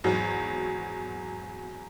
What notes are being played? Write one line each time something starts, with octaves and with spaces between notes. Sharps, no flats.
G#1 E2 F#3